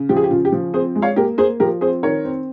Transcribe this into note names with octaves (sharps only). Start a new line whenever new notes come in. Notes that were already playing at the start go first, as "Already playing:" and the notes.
Already playing: C#3
F3 G4
G#4
G4
C#3 F4
G4
F3
C4 G#4 C5
G#3
C#5 F5
A#3 G4 A#4
A#3 G#4 C5
F3 G4 A#4
C4 G#4 C5
D#3 A#4 C#5
C4